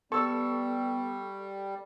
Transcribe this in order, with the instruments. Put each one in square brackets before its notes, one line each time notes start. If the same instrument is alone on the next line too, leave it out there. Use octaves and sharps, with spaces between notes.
[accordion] G3 [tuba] B3 [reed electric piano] A4 [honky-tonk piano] C#6 E6